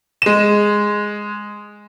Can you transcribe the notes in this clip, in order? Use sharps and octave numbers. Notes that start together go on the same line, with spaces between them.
G#3 E7